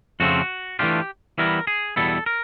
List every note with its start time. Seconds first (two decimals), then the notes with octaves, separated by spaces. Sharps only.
0.20 F2 C#3 F3 A3 C4 F#4
0.79 E3 A3 D4 F4 G4
1.38 E3 G3 B3 E4 A#4
1.67 G#4
1.96 E2 B2 G3 B3 E4 A4
2.26 A#4